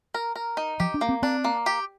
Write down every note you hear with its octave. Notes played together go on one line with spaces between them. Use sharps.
A#4
A#4
D#4
F3 G4
D4
A#3
C4
C4 D4
A#3
G4